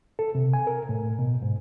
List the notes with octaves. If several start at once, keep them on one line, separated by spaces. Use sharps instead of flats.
A4
C3
G#5
A#4
A2
B2
G#2